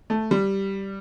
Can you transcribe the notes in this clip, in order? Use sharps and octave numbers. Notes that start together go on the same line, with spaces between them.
A3
G3